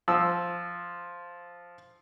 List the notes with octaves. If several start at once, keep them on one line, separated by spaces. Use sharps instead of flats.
F3 E6